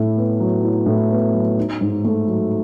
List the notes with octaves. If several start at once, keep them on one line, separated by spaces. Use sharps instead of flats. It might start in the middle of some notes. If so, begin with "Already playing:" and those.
Already playing: A2 E4
B3
F#3
E4
A2
B3
F#3
D#4
G#2
A3
F#3